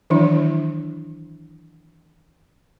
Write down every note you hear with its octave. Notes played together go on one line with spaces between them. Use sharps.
D#3 E3 F#3 D4 E4